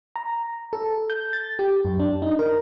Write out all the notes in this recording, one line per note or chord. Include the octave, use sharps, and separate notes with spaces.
A#5
A4
G6
A6
G4
F#2
D4
D#4
A#4